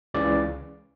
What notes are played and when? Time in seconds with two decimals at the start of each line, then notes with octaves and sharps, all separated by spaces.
0.14 C#2 C#3 E3 D5